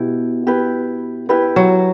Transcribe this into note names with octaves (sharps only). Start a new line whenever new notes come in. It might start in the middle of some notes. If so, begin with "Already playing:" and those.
Already playing: B2 E4 G4
E4 G4 B4
E4 G4 B4
F#3